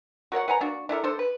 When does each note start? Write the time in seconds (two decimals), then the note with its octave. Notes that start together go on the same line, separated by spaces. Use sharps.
0.32 F#4 A#4 C#5 F#5
0.48 B4 F#5 G#5 A#5
0.60 A#3 D4 F#4
0.89 D4 E4 A4 A#4
1.04 D4 A4 C5
1.19 B4